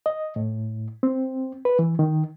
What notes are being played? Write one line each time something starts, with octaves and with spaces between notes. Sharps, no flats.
D#5
A2
C4
B4
E3
D#3